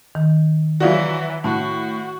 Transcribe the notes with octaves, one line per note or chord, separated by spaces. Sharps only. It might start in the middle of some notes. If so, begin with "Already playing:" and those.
D#3
E3 F#3 F#4 D5 F5
A2 F#4 A5